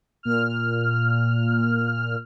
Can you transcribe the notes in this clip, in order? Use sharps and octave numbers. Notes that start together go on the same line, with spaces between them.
A#2 F6